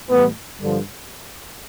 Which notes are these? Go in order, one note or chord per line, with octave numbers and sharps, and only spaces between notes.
A2 E3 G3 B3
G2 D3 F3